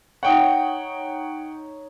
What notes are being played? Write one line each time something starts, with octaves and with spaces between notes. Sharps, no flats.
D#4 C#5 F#5 G5